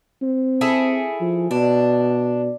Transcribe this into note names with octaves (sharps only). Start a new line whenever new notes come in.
C4
E4 G#4 A4
F3
B2 D4